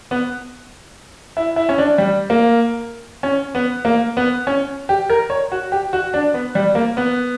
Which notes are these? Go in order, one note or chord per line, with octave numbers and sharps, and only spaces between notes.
B3
E4
E4
C#4
D4
G3
A#3
C#4
B3
A#3
B3
C#4
G4
A#4
C#5
F#4
G4
F#4
D4
B3
G3
A#3
B3